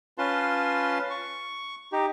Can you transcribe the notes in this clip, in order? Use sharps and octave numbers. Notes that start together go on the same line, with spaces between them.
C#4 F4 B4 A5 C6
C#6
D#4 G4